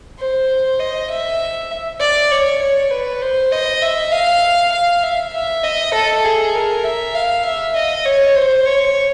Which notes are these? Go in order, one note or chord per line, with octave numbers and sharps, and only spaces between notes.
C5
D#5
E5
D5
C#5
C#5
B4
C5
D#5
E5
F5
F5
E5
E5
D#5
A4
G#4
A#4
E5
F5
E5
D#5
C#5
C5
C#5